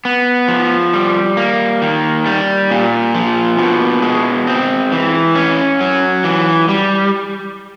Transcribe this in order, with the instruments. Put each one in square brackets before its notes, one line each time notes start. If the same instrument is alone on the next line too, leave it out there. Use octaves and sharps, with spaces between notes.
[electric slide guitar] B3
F3
G3
A#3
D#3
G3
A#2
F3
B2
G#3
C4
E3
C#4
F#3
E3
G3